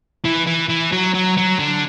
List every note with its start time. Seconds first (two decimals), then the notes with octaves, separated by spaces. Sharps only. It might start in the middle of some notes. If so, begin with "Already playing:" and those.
0.25 E3
0.47 E3
0.69 E3
0.92 F#3
1.14 F#3
1.37 F#3
1.59 D3